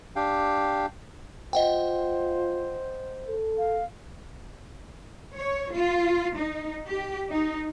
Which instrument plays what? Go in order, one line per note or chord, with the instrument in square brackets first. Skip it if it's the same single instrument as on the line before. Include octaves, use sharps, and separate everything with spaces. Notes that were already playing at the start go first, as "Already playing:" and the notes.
[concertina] D4 G4 F5 G5
[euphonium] F4 [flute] C5 [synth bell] D#5 F#5 G5
[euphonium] A4
[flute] F5
[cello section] C#5
F4
D#4
G4
D#4